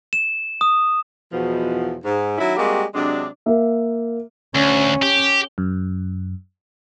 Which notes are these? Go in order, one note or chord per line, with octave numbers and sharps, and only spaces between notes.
E7
D#6
E2 B2 F3
G#2
D#3 F#3 C#4 E4
G3 G#3 A#3 C4 F#4 G4
C3 F#3 G#3 D4
A#3 E5
D2 C#4
G4
F#2